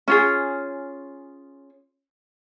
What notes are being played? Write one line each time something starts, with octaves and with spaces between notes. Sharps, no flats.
C#4 F4 G#4